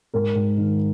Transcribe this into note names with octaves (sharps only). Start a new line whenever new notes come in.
G#2 A#4
G#2
D#3